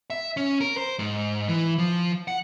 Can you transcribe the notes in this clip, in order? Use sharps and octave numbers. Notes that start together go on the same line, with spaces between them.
E5
C#4
A#4
C5
G#2
E3
F3
F#5